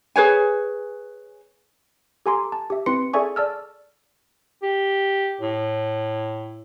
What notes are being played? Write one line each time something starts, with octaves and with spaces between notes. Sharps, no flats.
G#4 B4 C#5 G#5
G4 A4 G#5 A#5 C6 D6
A5
G4 E5
C4 E4 B4 C6 C#7
G#4 A4 D5 E5 G#5 C#6
D5 A5 E6 F6
G4
A2